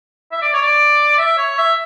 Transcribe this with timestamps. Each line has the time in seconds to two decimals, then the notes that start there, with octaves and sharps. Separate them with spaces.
0.32 E5
0.42 D5
0.54 C#5
0.62 D5
1.18 E5
1.38 C#5
1.58 E5